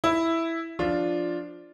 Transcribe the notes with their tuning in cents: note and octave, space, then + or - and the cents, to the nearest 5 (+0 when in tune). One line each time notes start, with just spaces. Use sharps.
E4 +0 E5 +0
F3 +0 D4 +0 F4 +0